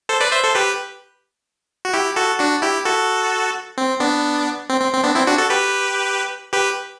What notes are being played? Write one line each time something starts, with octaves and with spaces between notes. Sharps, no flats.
A4 C5
B4 D5
C5 E5
A4 C5
G4 B4
F#4
E4 G4
F#4 A4
D4 F#4
E4 G4
F#4 A4
C4
B3 D4
C4
C4
C4
B3 D4
C4 E4
D4 F#4
F#4 A4
G4 B4
G4 B4